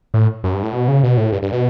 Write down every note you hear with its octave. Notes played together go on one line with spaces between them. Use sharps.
A2
F#2
G2
A2
B2
C#3
B2
A2
G2
G2
B2